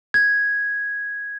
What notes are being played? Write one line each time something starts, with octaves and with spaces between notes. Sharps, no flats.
G#6